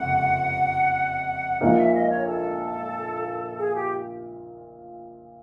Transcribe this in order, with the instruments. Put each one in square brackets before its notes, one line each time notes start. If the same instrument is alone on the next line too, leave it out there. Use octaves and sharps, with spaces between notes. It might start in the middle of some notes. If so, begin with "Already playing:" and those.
Already playing: [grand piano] F#1 F2 C3 [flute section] F#5
[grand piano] A#1 A#2 F3 A#3 D#4 [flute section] F#5
[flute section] E5
D#5
C#5
A4
G#4
G4